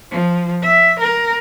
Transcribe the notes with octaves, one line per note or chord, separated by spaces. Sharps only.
F3
E5
A#4